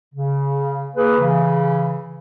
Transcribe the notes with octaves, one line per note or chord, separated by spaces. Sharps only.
C#3
A#3 G#4 B4
C#3 E3